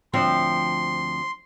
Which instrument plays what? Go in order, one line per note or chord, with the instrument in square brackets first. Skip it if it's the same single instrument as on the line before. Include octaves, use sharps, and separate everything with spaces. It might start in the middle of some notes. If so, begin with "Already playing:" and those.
[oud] D2 F3 C4 [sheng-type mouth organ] C6